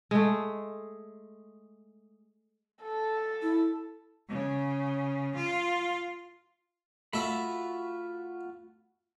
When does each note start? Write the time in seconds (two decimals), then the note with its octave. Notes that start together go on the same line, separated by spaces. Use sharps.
0.11 G#3 A3
2.83 A4
3.43 E4
4.29 C#3
5.36 F4
7.13 A3 F4 F#4 E5 B5